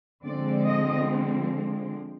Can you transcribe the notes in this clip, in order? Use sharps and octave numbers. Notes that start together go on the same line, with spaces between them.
D3 F3 G#3 C4 D5
D#5